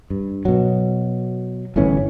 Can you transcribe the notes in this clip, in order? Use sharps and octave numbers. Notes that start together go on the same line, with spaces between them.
G2
B2 F#3
G1 A2 E3 C#4